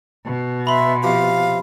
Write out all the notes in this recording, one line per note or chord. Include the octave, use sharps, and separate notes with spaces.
B2
E5 B5 C6
C3 F3 G4 F5